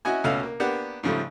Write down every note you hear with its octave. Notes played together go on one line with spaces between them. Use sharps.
C#4 E4 F#4 D#5 G#5
C#2 B2 A3 C#4 E5 F5
A#3
A#3 B3 D4 G4 F#5
G#2 C#3 F3 G3 A3